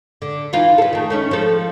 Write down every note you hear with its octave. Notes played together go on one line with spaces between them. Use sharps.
D3
E3 D#4 F4
A4 B4
D#3 A3
A3 C#4 D#4
F3 A4